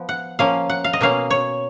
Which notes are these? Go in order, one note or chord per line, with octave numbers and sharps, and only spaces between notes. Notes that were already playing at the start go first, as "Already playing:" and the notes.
Already playing: F3 B3
F#5
F3 A#3 C#4 F5
F#5
F5
D#5
B2 A#3 C#4 F5
C#5